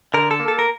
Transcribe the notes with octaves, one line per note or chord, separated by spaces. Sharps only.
D3 A#4
A4
A#3
A4
A#4